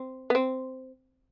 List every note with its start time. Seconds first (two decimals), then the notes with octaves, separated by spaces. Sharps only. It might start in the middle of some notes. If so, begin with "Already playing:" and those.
Already playing: C4
0.30 B3
0.35 C4